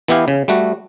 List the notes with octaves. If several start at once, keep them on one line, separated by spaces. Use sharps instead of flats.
E3 B3 E4 G4 F5
C#3
G3 A3 F#4